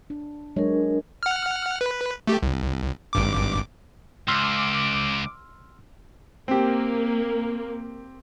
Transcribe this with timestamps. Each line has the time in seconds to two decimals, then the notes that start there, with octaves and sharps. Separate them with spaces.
0.10 D4
0.56 F#3 G#3 D4 A#4 C#5
1.23 F#5 F6
1.81 B4
2.27 A3 G4
2.43 C2
3.13 G#1 G2 D6
4.28 C#2 C6 D6 E6 F6
6.48 A#3 C4 G4